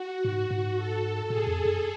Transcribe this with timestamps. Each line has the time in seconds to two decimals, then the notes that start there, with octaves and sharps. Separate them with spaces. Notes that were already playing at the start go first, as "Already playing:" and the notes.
Already playing: F#4
0.25 G#2
0.51 G#2
0.76 A4
1.29 A2 G#4
1.47 F2
1.65 F#2